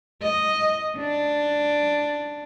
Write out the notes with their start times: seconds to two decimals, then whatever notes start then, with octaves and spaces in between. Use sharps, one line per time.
0.22 D#5
0.98 D4